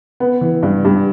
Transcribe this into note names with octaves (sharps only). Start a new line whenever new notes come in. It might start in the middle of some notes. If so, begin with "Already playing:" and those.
B3
E3
G2
G2